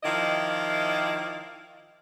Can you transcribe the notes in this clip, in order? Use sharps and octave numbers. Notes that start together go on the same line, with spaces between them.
D#3 F3 E4 D5 D#5 F5